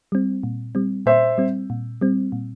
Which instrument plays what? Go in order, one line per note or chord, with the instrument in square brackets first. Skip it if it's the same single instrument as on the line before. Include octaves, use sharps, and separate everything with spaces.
[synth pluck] G3 C4
A#2
G3 C4
[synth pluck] A#2 [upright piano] C5 E5
[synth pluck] G3 C4
A#2
G3 C4
A#2